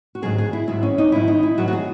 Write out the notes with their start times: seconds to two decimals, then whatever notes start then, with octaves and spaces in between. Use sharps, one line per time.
0.15 F#4
0.22 G#2 D#3 F#3 G#4
0.38 G#4
0.53 E4
0.67 G#2 D#3 F#3 E4
0.83 C#4
0.98 D#4
1.12 G#2 D#3 F#3 E4
1.28 D#4
1.43 E4
1.57 G#2 D#3 F#3 F#4
1.68 F#4
1.73 G#4